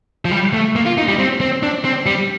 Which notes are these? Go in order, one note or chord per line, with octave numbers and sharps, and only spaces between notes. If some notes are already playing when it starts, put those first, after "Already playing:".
F3
G3
A3
A#3
F4
D#4
G3
C4
C4
D4
C4
G3